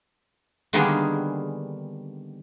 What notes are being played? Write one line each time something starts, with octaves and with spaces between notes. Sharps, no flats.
D3 D#3 G3 A#3 B3 G#4